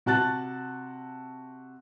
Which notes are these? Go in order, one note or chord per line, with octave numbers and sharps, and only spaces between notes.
C3 F#4 A5 F#6 A6